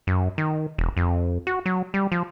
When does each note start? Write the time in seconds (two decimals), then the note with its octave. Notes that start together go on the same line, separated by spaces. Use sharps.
0.07 F#2
0.38 D#3
0.78 E1
0.97 F2
1.47 F#4
1.66 F#3
1.94 G3
2.12 F3